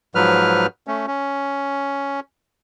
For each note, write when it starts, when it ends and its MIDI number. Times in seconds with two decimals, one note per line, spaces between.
0.15 0.67 44
0.15 0.67 53
0.15 0.67 54
0.15 0.67 71
0.15 0.67 89
0.87 1.06 57
0.87 1.06 61
1.07 2.20 61